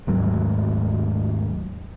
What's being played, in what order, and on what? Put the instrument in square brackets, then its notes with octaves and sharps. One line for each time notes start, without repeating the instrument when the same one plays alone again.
[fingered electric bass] D#2 G#2 F#3 A3